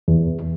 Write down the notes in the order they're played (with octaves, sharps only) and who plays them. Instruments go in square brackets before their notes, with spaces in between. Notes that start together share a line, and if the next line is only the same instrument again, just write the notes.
[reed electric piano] E2